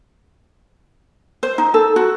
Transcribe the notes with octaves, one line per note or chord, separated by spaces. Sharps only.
C5
D#4
A4
F#4